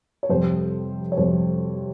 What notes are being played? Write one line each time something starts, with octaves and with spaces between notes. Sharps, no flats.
C#5
F2 C3 G3 C5
C#5
F2 C3 G3 C5